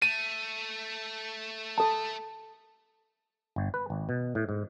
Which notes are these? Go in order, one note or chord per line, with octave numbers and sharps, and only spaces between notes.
A3 D#7
A4 A5
G1
B4
G#1
B2
A2
G#2